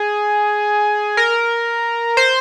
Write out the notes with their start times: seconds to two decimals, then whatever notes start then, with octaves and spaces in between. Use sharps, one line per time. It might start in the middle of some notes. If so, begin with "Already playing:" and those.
Already playing: G#4
1.17 A#4
2.17 C5